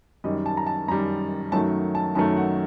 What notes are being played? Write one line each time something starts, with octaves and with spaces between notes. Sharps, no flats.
F#2 D#3 G3 D#5
A5
A#5
A5
F#2 D#3 G3 A#5
F#2 D#3 F#3 A3 A5
A5
F#2 D#3 F#3 A3 A5
F#5